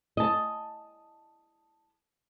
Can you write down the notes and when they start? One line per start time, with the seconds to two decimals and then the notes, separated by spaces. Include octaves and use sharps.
0.17 D#5 A5